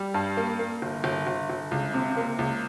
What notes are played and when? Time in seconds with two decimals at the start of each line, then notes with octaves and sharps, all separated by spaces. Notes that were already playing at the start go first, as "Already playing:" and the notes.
Already playing: G3
0.14 G2
0.37 A#3
0.59 A#3
0.82 G1
1.04 G1
1.27 G1
1.50 G1
1.71 C#2
1.94 C3
2.17 A#3
2.39 C#2